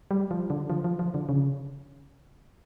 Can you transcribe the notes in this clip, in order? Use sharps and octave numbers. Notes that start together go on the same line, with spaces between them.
G3
F3
D3
F3
F3
F3
D3
C#3